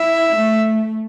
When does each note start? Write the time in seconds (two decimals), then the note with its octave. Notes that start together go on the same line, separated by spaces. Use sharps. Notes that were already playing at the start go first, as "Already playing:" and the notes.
Already playing: E4 E5
0.35 A3